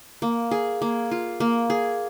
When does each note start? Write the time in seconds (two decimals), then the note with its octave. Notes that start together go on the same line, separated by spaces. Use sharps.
0.22 A#3
0.51 G#4
0.82 A#3
1.11 F4
1.40 A#3
1.70 G#4